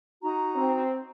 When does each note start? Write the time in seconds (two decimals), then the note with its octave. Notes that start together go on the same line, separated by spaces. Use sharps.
0.22 D#4 F#4 A#5
0.56 C4